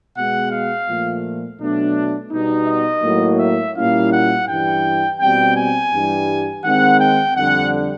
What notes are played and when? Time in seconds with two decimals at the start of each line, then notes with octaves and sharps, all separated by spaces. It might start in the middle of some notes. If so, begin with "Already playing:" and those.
0.15 B2 G#3 B3 F#5
0.51 F5
0.87 A#2 F3 A3
1.59 B2 F#3 A3 D4
2.32 B2 G3 B3 D#4
2.67 D#5
3.03 A2 F#3 A#3
3.40 E5
3.76 A#2 G3 A#3 C#4 E4 F5
4.11 F#5
4.47 G2 E3 G3 G5
5.20 B2 G3 C4 G5
5.56 G#5
5.92 G2 E3 G3
6.64 D#3 G#3 C4 D#4 F#5
7.00 G5
7.36 F2 D3 G3 F#5